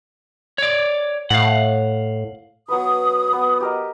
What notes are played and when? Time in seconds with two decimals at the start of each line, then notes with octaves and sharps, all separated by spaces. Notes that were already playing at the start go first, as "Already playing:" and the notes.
0.58 C#5 D5
1.30 A2 F5 F#5
2.68 F#3 B3 B4 D#6
3.33 B3
3.60 G4 A#4 D#5